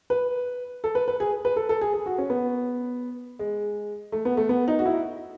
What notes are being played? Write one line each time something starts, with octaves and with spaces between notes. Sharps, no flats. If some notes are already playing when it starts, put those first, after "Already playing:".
B4
A4
B4
B4
G#4
B4
A4
A4
G#4
G#4
F#4
C#4
B3
G#3
A3
B3
A3
B3
D#4
F#4
E4